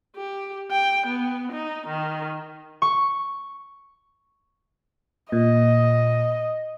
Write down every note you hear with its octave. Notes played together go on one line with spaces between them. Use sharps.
G4
G5
B3
D#4
D#3
C#6
A#2 D#5